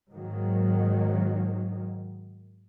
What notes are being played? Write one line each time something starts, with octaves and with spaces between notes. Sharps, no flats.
G#2 D#3 F#3 A#3